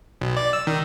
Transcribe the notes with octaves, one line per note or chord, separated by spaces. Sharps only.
B1
D5
E6
D#3